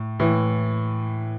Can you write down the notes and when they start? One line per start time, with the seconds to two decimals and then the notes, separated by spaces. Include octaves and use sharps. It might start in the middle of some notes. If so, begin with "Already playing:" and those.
Already playing: A2
0.20 A2 E3